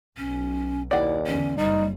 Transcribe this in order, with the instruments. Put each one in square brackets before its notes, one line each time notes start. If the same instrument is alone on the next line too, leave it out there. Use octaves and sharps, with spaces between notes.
[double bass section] B1 [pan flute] C#4
[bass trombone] D#2 [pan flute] E4 [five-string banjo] D5 F#5
[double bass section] E2 D3 [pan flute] C#4
[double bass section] F#1 [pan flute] G3 [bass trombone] D#4